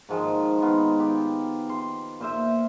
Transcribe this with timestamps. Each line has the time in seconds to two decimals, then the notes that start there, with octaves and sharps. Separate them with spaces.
0.09 G#2 D#3 F3 G#3
0.61 D#3 B3 F4
1.00 G4
1.70 C6
2.20 A#2 C5 E5